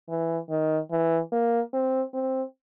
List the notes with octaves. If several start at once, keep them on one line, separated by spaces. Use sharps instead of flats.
E3
D#3
E3
A#3
C4
C4